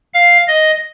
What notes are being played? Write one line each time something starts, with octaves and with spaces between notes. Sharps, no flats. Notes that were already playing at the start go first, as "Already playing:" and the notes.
F5
D#5